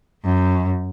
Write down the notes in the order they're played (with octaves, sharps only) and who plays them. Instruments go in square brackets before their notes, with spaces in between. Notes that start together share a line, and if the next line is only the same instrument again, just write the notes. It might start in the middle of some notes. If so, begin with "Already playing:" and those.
[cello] F#2